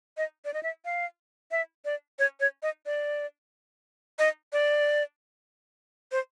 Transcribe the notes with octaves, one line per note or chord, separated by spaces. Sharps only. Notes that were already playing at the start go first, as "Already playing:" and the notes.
D#5
D5
D#5
E5
F5
E5
D5
C#5
C#5
D#5
D5
D#5
D5
C5